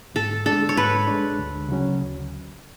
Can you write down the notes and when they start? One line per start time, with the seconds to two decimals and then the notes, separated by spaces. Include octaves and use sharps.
0.15 G#2 A4
0.46 G#3 D4 A4
0.69 C#5
0.77 G#2 B4
1.07 G#3 D4
1.39 D2
1.69 C#3 F#3 C#4
2.01 D2